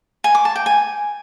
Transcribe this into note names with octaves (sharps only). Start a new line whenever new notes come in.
G#5
D6
A5
G5
G#5